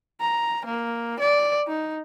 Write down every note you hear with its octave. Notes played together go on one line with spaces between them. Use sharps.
A#5
A#3
D5
D#4